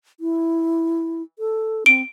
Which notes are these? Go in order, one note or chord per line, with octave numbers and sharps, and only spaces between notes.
E4
A4
C4 D7